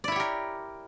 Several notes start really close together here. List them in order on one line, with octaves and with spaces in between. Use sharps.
D5 E4 C#5 G4 A#4